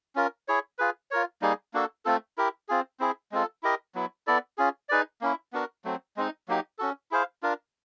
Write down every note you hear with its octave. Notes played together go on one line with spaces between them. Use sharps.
C#4 F4 A#4
E4 G#4 C#5
F4 G#4 B4
F4 A#4 C#5
G3 A#3 D#4 G#4
A#3 D4 F#4 A4
A3 C4 F4 A4
E4 G4 A#4
C4 F4 G#4
C4 E4 G#4
G#3 C4 F4 A4
E4 G4 A#4 D#5
F#3 B3 E4
B3 E4 A4 D5
C#4 F4 G#4
D#4 G#4 B4 D5
A#3 C#4 E4
B3 D4 F#4 A#4
F#3 A3 C4
G#3 C4 D#4
F#3 A#3 D#4 G4
C#4 F#4 A4
E4 G#4 C5 F5
D4 F4 A#4